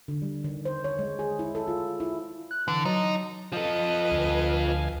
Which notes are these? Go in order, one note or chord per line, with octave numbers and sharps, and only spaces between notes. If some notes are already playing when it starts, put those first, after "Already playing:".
D3
G3
D#3
C5
C#5
G#3
G#4
E4
A4
F4
E4
F#6
D3 E3
F#3 D#4
F3 A4 B4 D#5
D2 F5 G#5